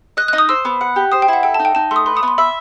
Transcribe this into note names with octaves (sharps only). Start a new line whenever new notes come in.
D#5 F#6
F#6
D#4
D#6
C5 E6
B3
F#5
G4
C5 D#6
G5
E4 F#5
A4 G5
A5
D#4
G5
D#4 A5
A3 C6 D#6
B4 C6
D#6
B3
C6
E5 B5